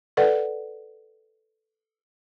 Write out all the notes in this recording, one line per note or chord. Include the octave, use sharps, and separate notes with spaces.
A4 B4 D5 F#5